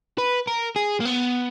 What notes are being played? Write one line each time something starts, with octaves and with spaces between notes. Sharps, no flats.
B4
A#4
G#4
A#3
B3